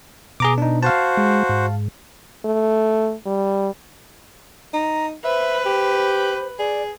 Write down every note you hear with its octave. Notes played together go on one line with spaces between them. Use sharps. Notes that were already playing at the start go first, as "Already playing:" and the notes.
B2 G#4 A#5 D6
D4 D#4
F#4 C5 F5 A5
G#3
G#2
A3
G3
D#4 A#5
B4 C5 E5
G4
G#4 D5